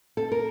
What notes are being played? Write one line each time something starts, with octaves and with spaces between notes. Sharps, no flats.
A4
A#4